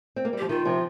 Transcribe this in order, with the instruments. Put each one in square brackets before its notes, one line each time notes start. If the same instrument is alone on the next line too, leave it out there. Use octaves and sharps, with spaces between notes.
[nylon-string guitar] C4
A#3
G3
[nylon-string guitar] F3 [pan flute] G4
[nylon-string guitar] D#3 [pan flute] F4
[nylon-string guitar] C3 F3